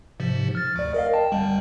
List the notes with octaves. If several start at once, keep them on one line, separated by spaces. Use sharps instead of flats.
G#2 C3 F3
F6 A6
D2 D5
A#4 D#5 F5
G5 A5
G1 F#2 G3